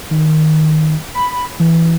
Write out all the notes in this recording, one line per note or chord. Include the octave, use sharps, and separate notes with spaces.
D#3
B5
E3